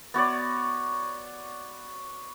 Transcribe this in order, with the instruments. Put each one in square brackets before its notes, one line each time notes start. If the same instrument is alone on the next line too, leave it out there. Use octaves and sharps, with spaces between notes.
[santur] B3 F#4 C#5 D5